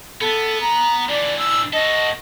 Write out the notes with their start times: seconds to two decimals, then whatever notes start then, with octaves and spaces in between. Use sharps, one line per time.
0.21 B3 A4
0.61 A#5
1.09 D3 E3 D5
1.39 E6
1.73 F#4 A4 D#5